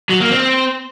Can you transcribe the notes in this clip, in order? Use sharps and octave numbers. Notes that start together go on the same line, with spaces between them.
F#3
A#3
C4